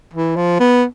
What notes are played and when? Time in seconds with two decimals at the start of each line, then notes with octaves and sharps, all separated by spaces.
0.13 E3
0.36 F3
0.60 B3